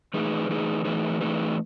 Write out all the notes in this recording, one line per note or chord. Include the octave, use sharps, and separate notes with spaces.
E3 A3 D#4 G#4 B4
E3 A3 D#4 G#4 B4
E3 A3 D#4 G#4 B4
E3 A3 D#4 G#4 B4